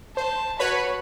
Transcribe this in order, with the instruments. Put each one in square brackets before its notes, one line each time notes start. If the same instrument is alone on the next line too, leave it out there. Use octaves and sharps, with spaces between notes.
[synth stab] C5 [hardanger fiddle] A5
[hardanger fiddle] F#4 [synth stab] B4 C#5 B5